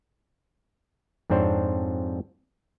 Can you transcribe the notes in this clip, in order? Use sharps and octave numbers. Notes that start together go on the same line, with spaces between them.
F2 G#2 C4 D4 C5 C#5